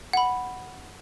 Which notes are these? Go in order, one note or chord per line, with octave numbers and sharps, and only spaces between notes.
F#5 B5